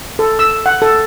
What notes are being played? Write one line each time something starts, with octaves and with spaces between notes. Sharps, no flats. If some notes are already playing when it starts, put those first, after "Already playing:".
A4
E6
F#5
A4